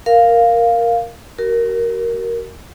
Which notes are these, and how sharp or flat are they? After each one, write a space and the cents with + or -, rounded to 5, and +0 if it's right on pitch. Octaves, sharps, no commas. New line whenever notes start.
A#4 +0 F5 +0
F#4 +40 A#4 +0